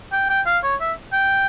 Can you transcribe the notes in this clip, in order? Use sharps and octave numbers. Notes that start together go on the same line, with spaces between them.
G5
G5
F5
C#5
E5
G5